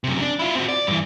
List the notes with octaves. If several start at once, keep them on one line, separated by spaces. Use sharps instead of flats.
F#2 C3
D4
E4 F4
C4 F#4
D5
G2 E3